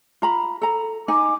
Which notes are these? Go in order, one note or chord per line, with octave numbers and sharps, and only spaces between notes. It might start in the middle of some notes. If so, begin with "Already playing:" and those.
F4 A#5 B5
A4 A#5
D#4 G#5 D6